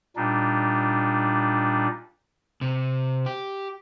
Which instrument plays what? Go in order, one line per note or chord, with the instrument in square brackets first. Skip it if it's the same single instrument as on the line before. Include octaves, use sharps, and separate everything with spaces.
[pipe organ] A#2 G3 D4 D#4
[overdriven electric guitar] C3
G4